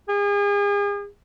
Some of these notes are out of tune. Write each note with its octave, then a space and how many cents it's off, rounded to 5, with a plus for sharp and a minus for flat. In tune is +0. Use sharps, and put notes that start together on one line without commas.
G#4 -40